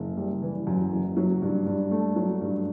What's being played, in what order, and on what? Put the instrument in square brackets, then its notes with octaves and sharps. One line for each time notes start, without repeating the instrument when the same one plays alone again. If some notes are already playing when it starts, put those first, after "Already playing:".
Already playing: [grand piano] F#1
G3
E3
F#2
F#1
F#3
G2
G2
A3
F#3
G2